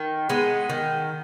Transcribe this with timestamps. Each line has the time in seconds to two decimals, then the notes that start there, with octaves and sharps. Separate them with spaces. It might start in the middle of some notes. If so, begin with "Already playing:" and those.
Already playing: D#3
0.29 G#3 B3 D#4
0.69 D#3